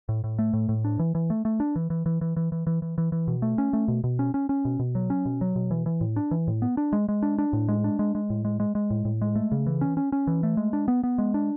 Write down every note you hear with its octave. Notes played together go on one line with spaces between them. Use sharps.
A2
A2
A3
A2
A2
D4
E3
E3
A3
A3
D4
E3
E3
E3
E3
E3
E3
E3
E3
E3
E3
B2
A3
C#4
A3
B2
B2
C#4
C#4
C#4
B2
B2
F#3
C#4
B2
F#3
B2
E3
E3
A2
D4
E3
A2
B3
D4
G#3
G#3
D4
D4
A2
G#3
D4
G#3
G#3
A2
G#3
G#3
G#3
A2
A2
G#3
A3
C#3
E3
C#4
C#4
C#4
E3
A3
G#3
D4
B3
B3
G#3
D4